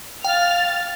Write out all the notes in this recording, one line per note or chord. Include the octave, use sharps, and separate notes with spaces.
F5 G5 F6 A6